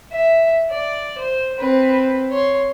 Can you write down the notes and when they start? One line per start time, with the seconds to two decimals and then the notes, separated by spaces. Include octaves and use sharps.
0.12 E5
0.70 D5
1.18 C5
1.58 C4 B4
2.30 C#5 C6